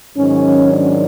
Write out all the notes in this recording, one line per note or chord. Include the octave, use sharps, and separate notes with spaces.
G#2 D#3 F#3 C#4
D4